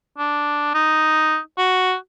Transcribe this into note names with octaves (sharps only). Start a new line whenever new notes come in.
D4
D#4
F#4